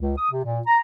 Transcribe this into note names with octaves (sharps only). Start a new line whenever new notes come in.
C#2
D#6
C3
A#2
A#5